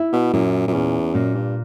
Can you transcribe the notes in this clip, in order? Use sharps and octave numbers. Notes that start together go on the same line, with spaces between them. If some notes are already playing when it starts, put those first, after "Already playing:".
Already playing: E4
B2
F#2 A#2
F#2
E2 C#4
F#2 A#2
G2